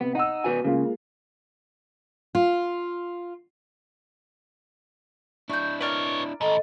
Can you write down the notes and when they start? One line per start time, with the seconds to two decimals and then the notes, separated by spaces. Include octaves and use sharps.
0.01 C3 B3
0.15 D#4 F#5 E6
0.44 B2 F#4 B4 G#5
0.65 C#3 G#3 A#3 F4
2.35 F4
5.49 D4 E4 C#6 G6
5.81 A#4 B4 C#5 D5 F6
6.41 A2 D#3 A4 D#5